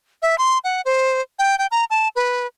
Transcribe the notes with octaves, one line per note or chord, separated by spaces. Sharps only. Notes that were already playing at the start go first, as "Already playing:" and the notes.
E5
C6
F#5
C5
G5
G5
A#5
A5
B4